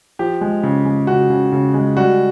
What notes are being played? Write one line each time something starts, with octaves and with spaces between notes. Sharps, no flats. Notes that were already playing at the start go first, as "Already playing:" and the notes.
F3 G4
G#3
C#3
G#3
C#3 F#4
C#3
C#3
G#3
G3 F#4